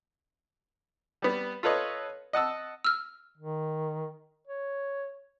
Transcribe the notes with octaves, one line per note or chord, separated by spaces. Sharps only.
G3 B3
F4 A4 B4 C#5 D#5
D#5 F#5 A5 E6
E6 F6
D#3
C#5